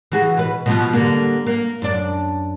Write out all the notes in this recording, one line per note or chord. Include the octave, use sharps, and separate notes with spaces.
E3 F#4 G#4
B2 B4
B2 F3 B3
D3 G3 A#3
A#3
F#2 D4